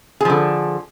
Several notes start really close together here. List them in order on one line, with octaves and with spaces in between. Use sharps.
G#4 F3 D3